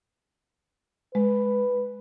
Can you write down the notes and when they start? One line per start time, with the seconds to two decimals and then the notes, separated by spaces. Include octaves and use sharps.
1.15 G#3 B4